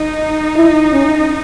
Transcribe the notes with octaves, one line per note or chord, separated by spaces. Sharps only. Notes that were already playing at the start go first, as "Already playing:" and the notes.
Already playing: D#4
E4
C#4